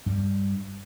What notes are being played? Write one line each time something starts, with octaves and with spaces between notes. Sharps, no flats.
G2 G3